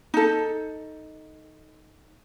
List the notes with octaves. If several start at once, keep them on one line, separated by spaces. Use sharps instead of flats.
D#4 A4